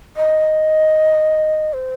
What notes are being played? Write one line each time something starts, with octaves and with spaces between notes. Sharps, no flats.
D#5
C5